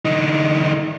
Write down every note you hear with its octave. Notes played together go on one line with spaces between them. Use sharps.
D3 D#4